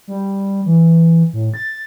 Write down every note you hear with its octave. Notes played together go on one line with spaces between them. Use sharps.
G3
E3
A2
A6